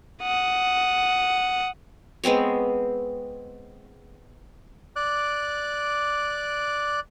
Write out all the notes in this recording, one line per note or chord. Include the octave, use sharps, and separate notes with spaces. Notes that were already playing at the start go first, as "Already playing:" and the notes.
F#5 D#6
G#3 B3 C4 C#5
D5 D6 F#6